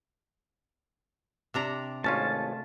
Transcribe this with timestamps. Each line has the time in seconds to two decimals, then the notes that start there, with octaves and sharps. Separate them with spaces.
1.54 C3 D4 A#5
2.04 G#1 A3 C#4 F4 A5